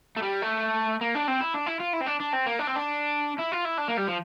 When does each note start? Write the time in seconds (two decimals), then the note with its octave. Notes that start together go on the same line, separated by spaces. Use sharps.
0.17 A3
0.23 G3
0.42 A3
1.01 A#3
1.15 D4
1.28 C4
1.41 E4
1.54 D4
1.67 E4
1.80 F4
1.94 E4
2.01 C4
2.07 D4
2.20 D4
2.33 C4
2.46 A#3
2.59 D4
2.67 C4
2.76 D4
3.38 E4
3.52 F4
3.65 E4
3.78 D4
3.88 A#3
3.97 G3
4.08 F3